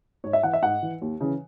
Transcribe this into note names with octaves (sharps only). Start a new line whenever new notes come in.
G#2 C#5
E5
E3 F#5
E5
G#2 F#5
E3
D#2
C#3 E3